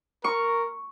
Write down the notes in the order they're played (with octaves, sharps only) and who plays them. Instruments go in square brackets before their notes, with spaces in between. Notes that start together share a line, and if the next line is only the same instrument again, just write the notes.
[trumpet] A#4 [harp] C#6